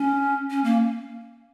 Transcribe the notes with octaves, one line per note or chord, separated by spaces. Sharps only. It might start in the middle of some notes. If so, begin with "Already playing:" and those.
Already playing: C#4
C#4
A#3